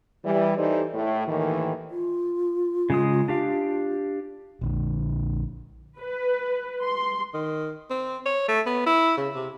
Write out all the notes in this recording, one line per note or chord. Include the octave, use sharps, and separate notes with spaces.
E3 G3
E3 D#4 G4 A4 C5 D5
A2
D#2 A2 D#3 E3
F4
C#3 G#3 D#6
D4 G4 F5
A#1 D3
B4
C6
D#3
C4
C#5
A3
B3
E4
C#3
C3